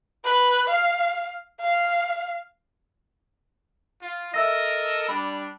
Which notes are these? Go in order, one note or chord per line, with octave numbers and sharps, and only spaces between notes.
B4
F5
F5
F4
A4 A#4 D#5 E5 E6 A#6
G3 D4 B5